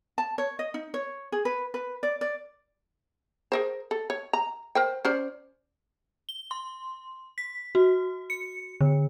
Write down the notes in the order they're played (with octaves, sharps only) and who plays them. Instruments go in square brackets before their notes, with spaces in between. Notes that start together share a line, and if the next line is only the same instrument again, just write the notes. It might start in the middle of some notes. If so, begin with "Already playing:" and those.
[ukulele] A5
C#5
D#5
D#4
C#5
G#4
B4
B4
D5
D5
[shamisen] G#4 A#4 C5
A4
C#5
A#5
A#4 C5 G5
C#4 C5 D5
[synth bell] G7
C6
B6
F#4
C#7
D3